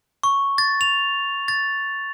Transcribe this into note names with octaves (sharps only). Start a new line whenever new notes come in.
C#6
A6
F7
A6